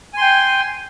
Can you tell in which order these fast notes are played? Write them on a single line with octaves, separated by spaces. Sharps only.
G#5 C6 G5